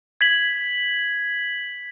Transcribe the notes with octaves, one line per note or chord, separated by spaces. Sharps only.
G#6 B6 F#7